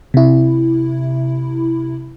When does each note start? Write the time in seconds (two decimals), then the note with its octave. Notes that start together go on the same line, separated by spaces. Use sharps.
0.14 C3 E4